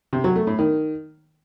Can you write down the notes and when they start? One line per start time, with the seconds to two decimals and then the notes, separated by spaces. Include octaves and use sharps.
0.13 C3
0.24 F#3
0.36 A3
0.47 A2
0.59 D#3